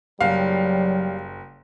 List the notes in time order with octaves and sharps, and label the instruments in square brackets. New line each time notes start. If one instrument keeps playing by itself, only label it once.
[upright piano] F#1 [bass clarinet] F#3 [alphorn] G3 [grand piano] F5